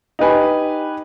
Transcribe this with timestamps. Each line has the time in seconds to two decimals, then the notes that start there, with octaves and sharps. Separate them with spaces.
0.19 D#4 G4 B4 G#5